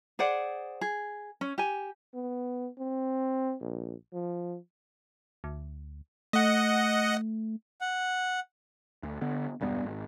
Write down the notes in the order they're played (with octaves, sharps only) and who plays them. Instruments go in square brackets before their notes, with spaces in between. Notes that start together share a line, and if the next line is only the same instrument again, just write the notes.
[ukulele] G#4 C5 D5 F#5
G#4
C#4
G4 G#5
[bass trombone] B3
C4
A#1
F3
[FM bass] D2
[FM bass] A3 [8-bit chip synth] D#5 F#5
[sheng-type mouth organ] F#5
[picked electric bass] D2
D3 B3
E1 G2 G3 B3
G#1